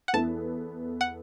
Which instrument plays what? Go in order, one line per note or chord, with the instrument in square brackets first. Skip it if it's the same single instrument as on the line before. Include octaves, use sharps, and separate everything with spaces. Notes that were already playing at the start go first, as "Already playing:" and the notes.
[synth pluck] F#5
[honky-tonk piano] E2 E3 B3 E4 A4 [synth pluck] A5
[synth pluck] F#5